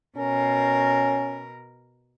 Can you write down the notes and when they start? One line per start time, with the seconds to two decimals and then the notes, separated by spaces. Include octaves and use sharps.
0.17 B2 C#4 A#4